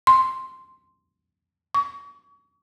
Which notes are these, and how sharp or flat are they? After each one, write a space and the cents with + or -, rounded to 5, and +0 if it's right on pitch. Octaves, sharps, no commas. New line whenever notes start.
C6 +0
C#6 +35